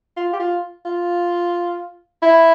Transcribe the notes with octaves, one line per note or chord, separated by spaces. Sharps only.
F4
G4
F4
F4
E4